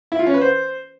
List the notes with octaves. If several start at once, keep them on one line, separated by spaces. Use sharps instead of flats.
E4
F4
C#4
B4
C5